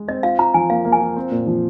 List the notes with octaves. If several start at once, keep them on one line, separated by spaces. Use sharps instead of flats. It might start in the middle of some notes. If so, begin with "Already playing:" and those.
Already playing: G#3
C4 D#5
F4 F5
F4 A#5
F3 G#5
A#3 F5
A#3
G#5
F4
C4
A#2
F3